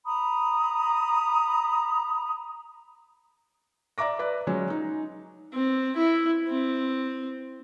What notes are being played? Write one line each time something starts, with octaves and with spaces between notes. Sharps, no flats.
A#5 B5 D#6
D5 E5 A#5 D6 A#6
B4 D5 E5
F#3 G#3 C#4
D#4
C4
E4
C4